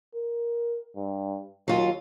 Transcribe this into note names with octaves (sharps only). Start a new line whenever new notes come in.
A#4
G2
D#2 F#3 F4